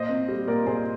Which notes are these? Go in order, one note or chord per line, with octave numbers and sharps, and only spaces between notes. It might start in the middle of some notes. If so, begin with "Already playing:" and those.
Already playing: A#2 C5 D#5
C4
G3
A#2 A#4 D5
A#2 G#4 C5